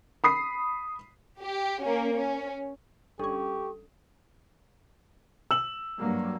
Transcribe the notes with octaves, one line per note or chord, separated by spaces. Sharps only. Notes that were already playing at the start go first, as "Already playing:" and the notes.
B5 D#6 C7
G4
A#3 C#4
C#4
G1 C#4 G4 A4 C#6
E6 F#7
G2 F#3 A#3